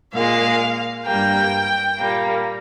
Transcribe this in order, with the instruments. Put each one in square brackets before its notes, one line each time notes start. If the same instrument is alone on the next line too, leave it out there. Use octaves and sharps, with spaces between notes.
[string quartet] A#2 G#3 F5
G2 G3 A#3 G5
A#2 G3 A#3